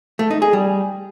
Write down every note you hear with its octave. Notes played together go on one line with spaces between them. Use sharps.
A3
D#4
G#4
G3